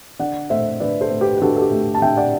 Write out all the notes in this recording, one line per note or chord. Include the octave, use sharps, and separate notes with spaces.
D3 D5 F#5
A3 C5 E5
D3 B4 D5
A4 C5
A3
G4 B4
B4
D3 F#4 A4
A4
G4
A3
A5
D3 E5 G5
D5 F#5